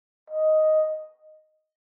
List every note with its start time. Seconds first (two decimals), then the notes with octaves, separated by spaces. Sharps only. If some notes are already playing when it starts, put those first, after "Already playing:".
0.30 D#5